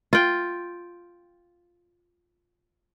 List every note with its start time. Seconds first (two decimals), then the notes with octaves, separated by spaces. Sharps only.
0.13 F4 G5